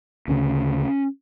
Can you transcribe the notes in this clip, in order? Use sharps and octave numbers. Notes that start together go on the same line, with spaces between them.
D2 C#3 C#4